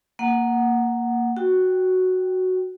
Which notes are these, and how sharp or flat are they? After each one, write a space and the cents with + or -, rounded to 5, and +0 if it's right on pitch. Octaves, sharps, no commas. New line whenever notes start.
A#3 +0 F#5 +0
F#4 +0 G5 +0